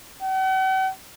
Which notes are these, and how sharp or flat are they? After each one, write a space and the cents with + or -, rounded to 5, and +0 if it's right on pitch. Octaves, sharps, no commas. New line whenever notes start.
F#5 +45